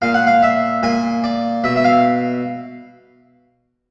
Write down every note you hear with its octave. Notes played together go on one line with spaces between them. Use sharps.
A#2 F5
F#5
F5
E5
A#2 G#5
D5
B2 E5
E5
F5